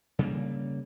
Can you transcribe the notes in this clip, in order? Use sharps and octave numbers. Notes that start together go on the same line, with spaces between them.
C#3 G3 G#3 A#3